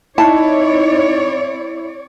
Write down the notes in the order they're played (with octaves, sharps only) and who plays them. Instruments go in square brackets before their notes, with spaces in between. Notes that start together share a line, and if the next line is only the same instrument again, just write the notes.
[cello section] C4 C#5 D5 [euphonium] D#4 [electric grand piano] E4 [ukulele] A5